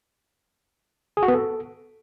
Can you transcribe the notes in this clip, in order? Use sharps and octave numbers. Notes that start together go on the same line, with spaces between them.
G#4
F#4
B3
A4